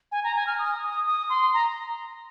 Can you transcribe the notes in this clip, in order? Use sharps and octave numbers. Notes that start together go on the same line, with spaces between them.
G#5
A#5
G#5
F6
D#6
D#6
D#6
C6
A#5